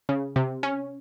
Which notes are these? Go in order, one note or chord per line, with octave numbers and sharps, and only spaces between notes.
C#3
C3
C#4